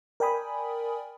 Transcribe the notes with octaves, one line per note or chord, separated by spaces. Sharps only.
A#4 D5 G5 G#5 B5 D#6